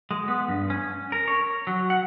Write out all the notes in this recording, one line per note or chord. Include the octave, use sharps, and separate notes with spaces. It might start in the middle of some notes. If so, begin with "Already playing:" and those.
G#3
B3
G2
C#4
A#4
C#5
F#3
F#5